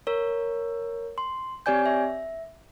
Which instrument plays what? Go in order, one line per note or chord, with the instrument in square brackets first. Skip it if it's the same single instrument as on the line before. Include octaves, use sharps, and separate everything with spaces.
[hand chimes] A#4 C#5
C6
C4 G4 C#5 D5 G#5 G6
E5